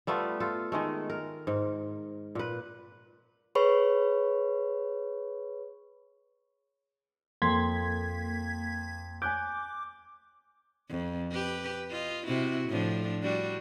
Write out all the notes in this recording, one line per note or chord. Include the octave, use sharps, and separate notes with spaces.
G3 A3 B3 F4
F4 A4
D#3 G#3 A3
A#4
G#2
A#2 B4
G#4 B4 C#5 B5 C#6
F2 A#3 C6 G#6 B6
G#5 D6 F#6 G6
F2
G4 B4
F4 D#5
C3 E4 F#4
A2 F3 D4
G3 D4 F#4